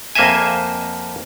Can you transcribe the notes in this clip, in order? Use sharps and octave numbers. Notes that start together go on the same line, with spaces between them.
F2 A#3 C5 D#5 E5 G#5